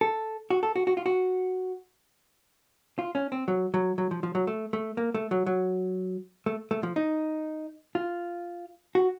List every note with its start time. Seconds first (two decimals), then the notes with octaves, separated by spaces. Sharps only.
0.01 A4
0.50 F#4
0.63 A4
0.76 F#4
0.87 F#4
0.97 F4
1.06 F#4
2.99 F4
3.15 C#4
3.32 C4
3.48 F#3
3.74 F#3
3.98 F#3
4.11 F3
4.23 F3
4.35 F#3
4.47 A3
4.73 A3
4.97 A#3
5.14 A3
5.31 F#3
5.46 F#3
6.46 A3
6.71 A3
6.83 F3
6.96 D#4
7.95 F4
8.95 F#4